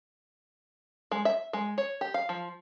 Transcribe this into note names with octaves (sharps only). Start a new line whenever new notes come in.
G#3
E5
G#3
C#5
G4
F5
F3